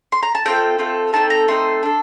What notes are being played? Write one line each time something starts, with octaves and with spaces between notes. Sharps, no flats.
C6
A#5
A5
A3 C4 F4 A4 G5
A3 C4 F4 A4
A3 C4 D#4 A4 A5
A#5
A3 C4 D#4 A4 C6
D4 A4